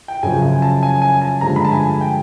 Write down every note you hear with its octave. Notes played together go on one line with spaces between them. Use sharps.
G5
F#2 C#3 F3 G#5
G#5
A5
G#5
G#5
A5
G2 D3 F3 G#3 A#5
B5
A5
G#5
G#5
G5